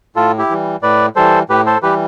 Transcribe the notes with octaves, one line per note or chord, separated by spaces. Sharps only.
A2 F4 A4
E4 G4
E3 G3
A2 B4 D5
E3 G3 A4 C5
A2 G4 B4
A4 C5
E3 G3 G4 B4